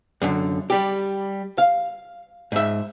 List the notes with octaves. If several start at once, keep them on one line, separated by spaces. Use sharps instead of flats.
F#2 D3
G3 G4
F5
G#2 E5